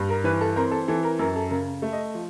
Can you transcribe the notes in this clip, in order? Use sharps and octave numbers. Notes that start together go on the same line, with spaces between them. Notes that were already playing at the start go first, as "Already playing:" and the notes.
Already playing: G2
A#4
E3 B4
A4
C4 A#4
A4
E3 A4
A#4
F#2 A#4
A4
C#3 A#4
A3
D#5
F3